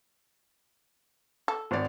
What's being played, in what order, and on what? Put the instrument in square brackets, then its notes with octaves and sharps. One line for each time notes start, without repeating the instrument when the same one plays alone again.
[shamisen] A4
[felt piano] G#1 C#5 D5